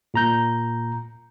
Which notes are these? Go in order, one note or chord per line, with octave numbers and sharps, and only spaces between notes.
A#2 A#5 G6